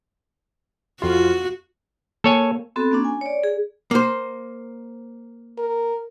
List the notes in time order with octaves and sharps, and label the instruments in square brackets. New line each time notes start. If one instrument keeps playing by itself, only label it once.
[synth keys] F2 F4 [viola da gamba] F#4
[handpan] A#3 [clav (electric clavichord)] A4 C#5 G#5
[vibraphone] B3 C4 F#4 A4
A#3 C#4 D4
G#5
C#5 D5
G#4
[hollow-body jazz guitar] A#3 C5
[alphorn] A#4